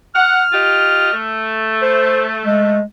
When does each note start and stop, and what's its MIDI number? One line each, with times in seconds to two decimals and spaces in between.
0.15 0.41 78
0.15 1.20 89
0.53 1.11 65
0.53 1.11 67
0.53 1.11 75
1.13 2.79 57
1.82 2.24 72
2.46 2.82 56